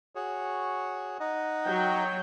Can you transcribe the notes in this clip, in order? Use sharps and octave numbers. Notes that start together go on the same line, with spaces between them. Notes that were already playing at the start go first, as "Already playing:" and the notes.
F#4 G#4 C#5
D#4 D#5 F#5
F#3 G5